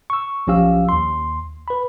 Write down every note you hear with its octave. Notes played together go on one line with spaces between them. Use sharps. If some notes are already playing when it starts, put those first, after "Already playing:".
C#6 E6
B1 F3 C#4 G4 F5 E6
D#2 C6
B4 B5